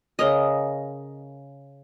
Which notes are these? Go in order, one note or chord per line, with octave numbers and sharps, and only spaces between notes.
C#3 A#4 D#5